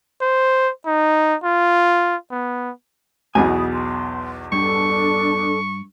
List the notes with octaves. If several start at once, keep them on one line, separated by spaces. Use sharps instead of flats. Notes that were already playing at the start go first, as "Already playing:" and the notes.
C5
D#4
F4
B3
B1 E2 B2 G#5 B5 D#6
C6
G2 D4 A4 C#6